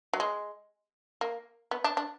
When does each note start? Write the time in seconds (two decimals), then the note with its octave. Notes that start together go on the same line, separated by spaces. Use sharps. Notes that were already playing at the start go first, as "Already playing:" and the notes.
0.13 F#3
0.20 G#3
1.21 A#3
1.71 B3
1.84 D4
1.97 D4